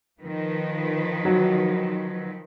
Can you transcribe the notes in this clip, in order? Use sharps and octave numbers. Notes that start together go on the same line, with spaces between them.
D#3 F3 B4
F#3